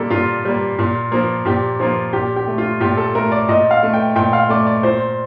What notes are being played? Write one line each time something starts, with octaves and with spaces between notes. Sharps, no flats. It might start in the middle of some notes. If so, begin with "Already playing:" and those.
Already playing: A#2 G3 A#3 A4
A#2 F4
G3 A#3
A#2
F3 A#3
A#2 G4
F3 A#3 F4
A#2 G4
G4
A3
F4
A#2 G4
A4
A3 A#4
D5
A#2 D#5
F5
A3
G5
A#2 G5
F5
A3 D5
D5
A#2 C5